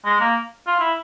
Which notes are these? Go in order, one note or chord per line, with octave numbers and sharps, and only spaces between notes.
G#3
A#3
F4
E4